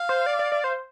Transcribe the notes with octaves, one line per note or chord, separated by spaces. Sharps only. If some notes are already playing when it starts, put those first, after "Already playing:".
Already playing: F5
C5
D5
D5
D5
C5